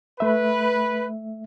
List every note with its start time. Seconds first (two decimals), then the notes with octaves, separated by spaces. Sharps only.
0.20 A3 B4 E5